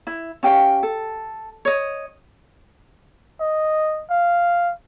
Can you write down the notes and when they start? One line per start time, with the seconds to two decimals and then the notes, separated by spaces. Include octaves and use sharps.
0.07 E4
0.43 C#4 G4 F5 G5
0.83 A4
1.65 C#5 D#5
3.41 D#5
4.11 F5